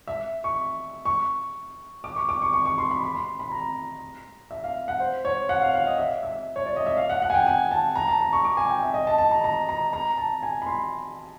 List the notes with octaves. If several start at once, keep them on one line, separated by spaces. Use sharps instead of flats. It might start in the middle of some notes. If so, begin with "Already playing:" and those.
E5
C#6
C#6
D6
C#6
D6
C#6
C#6
C#6
C6
B5
B5
C6
B5
A#5
E5
F5
F#5
C5
C#5
F#5
F5
F5
D#5
E5
E5
C#5
D5
D#5
E5
F5
F#5
F#5
G#5
G5
G#5
A5
A#5
A5
A#5
C#6
D6
G#5
G5
E5
D#5
A5
A5
A#5
A#5
A#5
A#5
A5
G#5
B5
C6